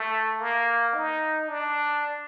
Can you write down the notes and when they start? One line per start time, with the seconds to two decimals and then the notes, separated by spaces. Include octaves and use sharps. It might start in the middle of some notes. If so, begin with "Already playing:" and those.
Already playing: A3
0.40 A#3
0.94 D#4
1.49 D4